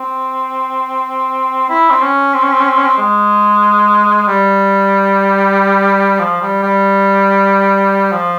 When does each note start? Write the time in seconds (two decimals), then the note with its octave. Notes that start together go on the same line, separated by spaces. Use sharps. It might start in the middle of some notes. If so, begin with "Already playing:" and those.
Already playing: C4
1.69 E4
1.90 C4
2.02 C#4
2.34 C4
2.43 C#4
2.52 C4
2.59 C#4
2.68 C4
2.77 C#4
2.86 C4
2.98 G#3
4.27 G3
6.20 F3
6.42 G3
6.63 G3
8.12 F3